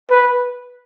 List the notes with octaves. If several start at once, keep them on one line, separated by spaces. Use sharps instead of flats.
B4